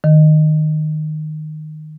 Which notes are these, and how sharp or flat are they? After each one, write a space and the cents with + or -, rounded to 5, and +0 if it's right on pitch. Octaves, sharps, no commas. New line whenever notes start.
D#3 -15